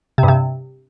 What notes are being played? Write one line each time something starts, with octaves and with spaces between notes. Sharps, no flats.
C3
G2
C3